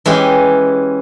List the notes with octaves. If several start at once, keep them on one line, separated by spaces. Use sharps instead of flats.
E3 G#3 C#4 G4